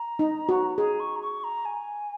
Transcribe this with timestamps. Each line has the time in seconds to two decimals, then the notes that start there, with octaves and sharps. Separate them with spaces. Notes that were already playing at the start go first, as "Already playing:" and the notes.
Already playing: A#5
0.19 D#4
0.49 F#4
0.78 G#4 A#5
1.00 C#6
1.16 A#5
1.22 C#6
1.44 A#5
1.65 G#5